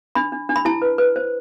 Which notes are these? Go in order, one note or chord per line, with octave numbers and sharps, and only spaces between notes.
D4 B5
D4
D4
B5
E4 A5
B4
B4
C5